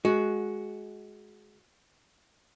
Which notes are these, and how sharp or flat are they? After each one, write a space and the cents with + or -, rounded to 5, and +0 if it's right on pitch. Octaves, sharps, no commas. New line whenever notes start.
G#3 +20 F#4 +0